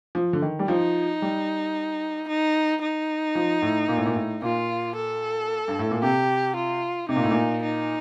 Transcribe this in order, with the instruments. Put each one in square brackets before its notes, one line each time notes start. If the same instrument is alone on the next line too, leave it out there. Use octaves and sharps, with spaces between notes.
[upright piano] F3
D3
D#3
G3
[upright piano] F3 [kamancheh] D#4
[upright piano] G3
[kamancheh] D#4
D#4
[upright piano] F3
A2
A#2
A2
A#2
A2
[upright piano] A#2 [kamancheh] F4
[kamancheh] A4
[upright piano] G2
A2
A#2
[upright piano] C3 [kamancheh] G4
[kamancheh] F4
[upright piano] C3 [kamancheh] D#4
[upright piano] A#2
A2
A#2
[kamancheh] D#4